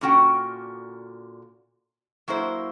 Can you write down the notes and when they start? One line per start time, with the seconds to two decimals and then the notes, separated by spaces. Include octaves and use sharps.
0.01 A#2 D3 C#4 F#4 F#5 G5
2.28 F#3 A#3 E4 C5